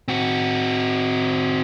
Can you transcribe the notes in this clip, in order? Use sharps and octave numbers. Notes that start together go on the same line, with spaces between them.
C4 F#4